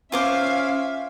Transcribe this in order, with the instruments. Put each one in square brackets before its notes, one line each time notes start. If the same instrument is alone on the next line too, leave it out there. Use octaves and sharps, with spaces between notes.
[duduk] C#4 [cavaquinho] F4 C5 D6 [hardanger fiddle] E5 [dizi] F5